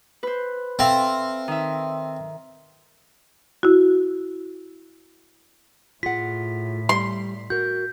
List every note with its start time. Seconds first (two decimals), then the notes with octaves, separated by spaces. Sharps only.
0.23 B4 C5
0.79 C4 A4 E5 F5
1.48 D#3 E5
3.63 E4 F#4
6.03 A2 F4 G#4 F#5 B6
6.89 G3 C6
7.50 F#4 A#4 G6